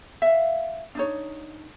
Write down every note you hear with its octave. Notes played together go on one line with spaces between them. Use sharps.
E5 F5
D4 D#4 C#5